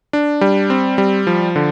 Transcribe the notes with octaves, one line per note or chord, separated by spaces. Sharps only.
D4
G3
C4
G3
F3
D3